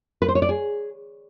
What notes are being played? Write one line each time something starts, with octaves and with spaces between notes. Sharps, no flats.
B4
C5
C#5
D5
G#4